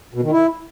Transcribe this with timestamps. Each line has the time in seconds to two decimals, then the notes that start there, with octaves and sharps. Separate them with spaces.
0.14 B2
0.23 D#3
0.31 E4